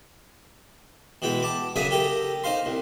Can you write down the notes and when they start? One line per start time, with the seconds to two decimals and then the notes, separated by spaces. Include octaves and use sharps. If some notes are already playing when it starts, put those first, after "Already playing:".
1.22 B2 E3 G#3 G5
1.43 A5 D6
1.76 F#2 C#3 G#4 E5 G#5 D#6
1.91 G4 A4 A#4 A#5
2.44 D#4 C5 F5 C6
2.66 C2